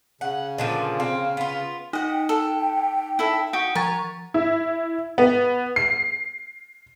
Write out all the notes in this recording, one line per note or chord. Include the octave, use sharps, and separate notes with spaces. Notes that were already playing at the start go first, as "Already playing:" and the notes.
C#3 F#5
A#2 D3 F3
C4 F5
B3 F4
D#4 D#5 F#5 G5
A4
E4 A4 E5
F#4 F#5 G5 D#6
F3 C#5 A#5 A6
E4
B3
C7